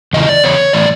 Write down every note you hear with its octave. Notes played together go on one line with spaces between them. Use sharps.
E2 C#3 E3 D#5
D5
E2 C#3 C#5
A2 E3 D5